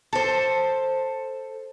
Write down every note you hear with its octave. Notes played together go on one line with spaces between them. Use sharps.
A4 C5